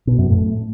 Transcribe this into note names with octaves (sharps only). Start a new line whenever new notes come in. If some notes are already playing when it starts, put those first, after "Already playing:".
B2
F#2
A2